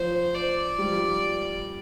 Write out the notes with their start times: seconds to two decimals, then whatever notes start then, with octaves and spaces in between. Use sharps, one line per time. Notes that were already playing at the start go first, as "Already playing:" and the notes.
Already playing: F3 C5
0.34 D5
0.78 G3
0.88 F3
0.97 G3